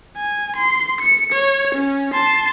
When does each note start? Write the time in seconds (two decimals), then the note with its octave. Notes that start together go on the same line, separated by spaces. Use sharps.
0.17 G#5
0.57 C6
1.01 C#7
1.33 C#5
1.75 C#4
2.13 A5 C6